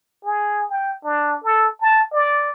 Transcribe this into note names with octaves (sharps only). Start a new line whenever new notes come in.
G#4
G5
D4
A4
A5
D5